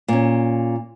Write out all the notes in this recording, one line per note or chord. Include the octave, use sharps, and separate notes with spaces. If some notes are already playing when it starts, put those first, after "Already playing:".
A#2 C#4